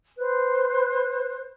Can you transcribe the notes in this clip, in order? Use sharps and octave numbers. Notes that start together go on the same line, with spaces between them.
B4 C5 F#6